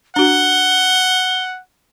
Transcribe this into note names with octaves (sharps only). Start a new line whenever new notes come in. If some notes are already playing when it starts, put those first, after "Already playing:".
D4 F#4 F#5 G7